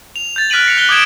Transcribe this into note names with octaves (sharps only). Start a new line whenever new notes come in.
F7
G6 A6
F6 F#6 B6 D7 D#7 F#7
A#6 C#7 F7
F#6 G7
D6 D#6 G6 G#6 D7 E7